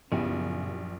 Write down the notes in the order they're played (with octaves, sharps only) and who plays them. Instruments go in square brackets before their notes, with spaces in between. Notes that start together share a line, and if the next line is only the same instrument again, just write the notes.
[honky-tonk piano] A#1 [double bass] F#2 [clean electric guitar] C#3 [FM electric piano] B3 E4 G4